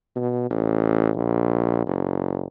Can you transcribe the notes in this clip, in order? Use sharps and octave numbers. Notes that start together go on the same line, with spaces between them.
B2
A1
A#1
F#1